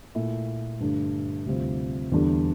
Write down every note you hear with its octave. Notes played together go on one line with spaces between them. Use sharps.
A#2 A3 E4
G2 D3 A3 D4
D2 C3 G3 C4 F4
E2 D3 G3 D4 A4